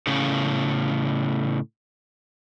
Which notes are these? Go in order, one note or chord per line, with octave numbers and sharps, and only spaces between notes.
A2 C#3